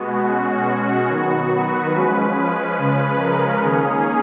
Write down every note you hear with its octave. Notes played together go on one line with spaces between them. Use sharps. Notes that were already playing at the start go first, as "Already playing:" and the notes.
Already playing: B2 G#3 B3 F#4
B2 G#3 C#4 F#4
D#3 F#3 B3 F#4
B4
F3 G#3 C#4 B4
C#3 F3 G#3 C#4
A#4
D#3 A#3 C#4 G#4